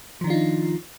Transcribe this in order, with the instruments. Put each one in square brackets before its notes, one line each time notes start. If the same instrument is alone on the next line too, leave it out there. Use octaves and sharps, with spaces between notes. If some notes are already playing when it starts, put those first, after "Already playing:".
[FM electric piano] F3
D#3
D4
F4
D#4